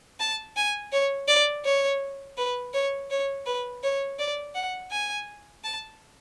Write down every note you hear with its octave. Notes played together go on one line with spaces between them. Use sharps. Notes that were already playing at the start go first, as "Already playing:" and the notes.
A5
G#5
C#5
D5
C#5
B4
C#5
C#5
B4
C#5
D5
F#5
G#5
A5